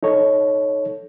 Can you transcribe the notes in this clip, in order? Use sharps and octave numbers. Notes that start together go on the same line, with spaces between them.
D#4 A4 C#5